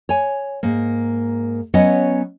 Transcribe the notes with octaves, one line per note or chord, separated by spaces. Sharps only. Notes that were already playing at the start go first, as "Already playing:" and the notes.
C#5 G#5
G#2 A#3
F#3 B3 C#4 B4 D#5 F#5